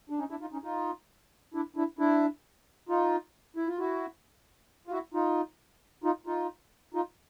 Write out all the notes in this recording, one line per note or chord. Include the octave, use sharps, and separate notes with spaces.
D4
C#4 D#4
D4 E4
D#4 F4
C#4 D#4
D#4 F4
D4 E4
D4 E4
D4 E4
D#4 F4
E4
F4
E4 F#4
F4
E4 F#4
D#4 F4
D#4 F4
D#4 F4
D#4 F4